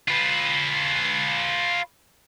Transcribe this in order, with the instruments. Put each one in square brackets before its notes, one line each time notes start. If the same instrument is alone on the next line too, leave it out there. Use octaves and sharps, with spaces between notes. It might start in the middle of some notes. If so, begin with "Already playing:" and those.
[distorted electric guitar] F4 B4